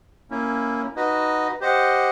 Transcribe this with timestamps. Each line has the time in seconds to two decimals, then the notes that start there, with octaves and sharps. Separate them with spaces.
0.31 A#3 C#4 E4
0.96 D#4 F#4 B4 D#5
1.61 G4 C5 D#5 F#5